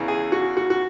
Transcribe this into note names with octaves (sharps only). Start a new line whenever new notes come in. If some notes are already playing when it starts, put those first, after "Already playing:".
Already playing: E2 C#3 E3
G#4
F#4
F#4
F#4